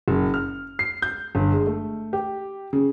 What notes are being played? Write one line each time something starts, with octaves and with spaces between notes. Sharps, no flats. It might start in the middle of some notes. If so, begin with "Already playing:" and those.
F#1
F6
C7
G6
G1
G#3
A3
G4
C#3